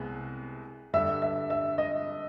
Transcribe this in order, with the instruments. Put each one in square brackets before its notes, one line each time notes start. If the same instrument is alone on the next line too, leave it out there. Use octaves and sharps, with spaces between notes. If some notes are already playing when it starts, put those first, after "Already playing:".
Already playing: [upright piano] C2 C3 G#3 B3
[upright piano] G2 D3 G3 [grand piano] E5
[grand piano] E5
E5
D#5